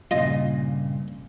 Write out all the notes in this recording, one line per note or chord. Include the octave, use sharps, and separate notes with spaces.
G2 A#2 C#3 F4 D#5